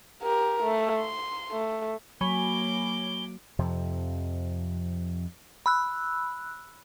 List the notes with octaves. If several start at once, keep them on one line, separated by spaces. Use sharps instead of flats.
G4 A#4
A3
C6
A3
F#3 A#3 C#5 G#5 B5 D6 G7
F2 C3 F3
B5 E6 F#6